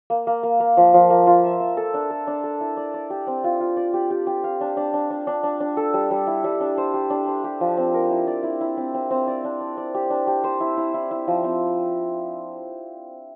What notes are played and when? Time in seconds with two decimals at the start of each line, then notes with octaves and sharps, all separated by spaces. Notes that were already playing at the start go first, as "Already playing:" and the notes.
0.10 A#3
0.27 A#3
0.43 A#3
0.60 A#3
0.77 F3
0.94 F3
1.10 A#3
1.27 F4
1.44 E5
1.60 E5
1.77 A4
1.94 D4
2.10 A4
2.27 D4
2.44 A4
2.61 E4
2.77 D5
2.94 D5
3.10 G4
3.27 C4
3.44 F4
3.60 F4
3.77 D5
3.94 G4
4.10 G4
4.27 G4
4.44 F5
4.61 D4
4.77 D4
4.94 D4
5.11 D4
5.27 D4
5.43 D4
5.60 D4
5.77 A4
5.94 G3
6.11 G3
6.27 E4
6.44 G3
6.60 D4
6.78 C5
6.94 G4
7.10 D4
7.27 C5
7.44 G4
7.61 F3
7.77 C4
7.94 A#4
8.11 E4
8.27 D5
8.43 E4
8.61 E4
8.77 C4
8.94 C4
9.11 C4
9.28 D5
9.44 D4
9.60 D5
9.77 D5
9.94 G4
10.10 D4
10.27 G4
10.44 C5
10.61 E4
10.77 E4
10.94 E4
11.11 E4
11.27 F3
11.44 C4